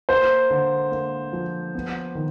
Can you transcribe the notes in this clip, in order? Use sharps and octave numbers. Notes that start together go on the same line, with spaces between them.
A#3 C5
D3
A#3
F3
B3
D#3